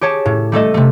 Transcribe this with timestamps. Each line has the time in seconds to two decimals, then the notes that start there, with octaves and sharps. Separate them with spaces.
0.01 G4 G#4 C#5 A5
0.25 A2
0.52 G3 A3 A4 D#5
0.74 C3 A3